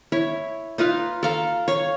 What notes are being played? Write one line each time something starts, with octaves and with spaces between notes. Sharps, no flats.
E4 C#5
D#4 F4 B4 F5
A4 F5 A#5
C#5 F5